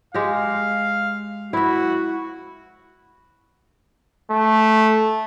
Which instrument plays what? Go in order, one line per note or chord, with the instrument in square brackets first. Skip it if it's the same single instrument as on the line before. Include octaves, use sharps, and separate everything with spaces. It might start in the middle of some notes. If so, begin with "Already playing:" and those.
[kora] G#3 G4 [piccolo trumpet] F5
[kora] E4 E5 [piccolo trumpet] F#4
[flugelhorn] A3